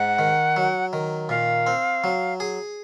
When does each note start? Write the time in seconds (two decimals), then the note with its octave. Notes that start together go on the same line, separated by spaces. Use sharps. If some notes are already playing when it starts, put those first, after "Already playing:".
Already playing: G#2 F#5
0.19 D#3
0.56 F#3
0.93 D#3
1.29 A#2 F5
1.67 C4
2.04 F#3
2.40 G#4